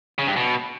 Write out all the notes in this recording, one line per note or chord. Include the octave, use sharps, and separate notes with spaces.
C#3
G2
B2